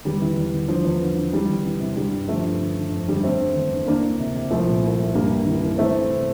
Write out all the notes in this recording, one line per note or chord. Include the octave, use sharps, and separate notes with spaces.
E2 G3
E3
E2
E3
D3 F3
E2
D3
D3
E3 G3
E2
E3
C3
D3 G3
G2
D3 F3 A3
G2
D3
D3
F2
D3 G3
D3 A3 C4
D3
E2
D3
E3 A#3 D4
D2
C3
C3
C2 F3 A3
A#2
C2
C2
G2 G3 A#3
G2
E3
E3
E3 A3 C4
E3
C3